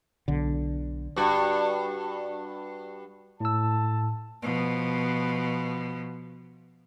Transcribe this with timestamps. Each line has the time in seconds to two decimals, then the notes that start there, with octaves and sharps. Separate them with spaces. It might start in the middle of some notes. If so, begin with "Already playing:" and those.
0.28 B1 D3
1.16 G2 F#4
3.40 A2 A5 E6
4.42 B2 F3